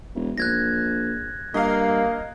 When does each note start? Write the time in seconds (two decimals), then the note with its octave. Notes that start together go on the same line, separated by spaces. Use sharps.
0.15 E1
0.38 A#1 F#6 G#6 A#6
1.54 G2 A#3 D#5 F5